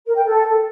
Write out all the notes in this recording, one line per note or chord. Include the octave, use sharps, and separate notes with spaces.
A#4
G5
A4